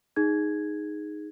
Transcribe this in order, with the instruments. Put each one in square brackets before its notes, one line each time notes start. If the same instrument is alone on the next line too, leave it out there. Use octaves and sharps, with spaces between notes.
[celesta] D#4 G#4 G#6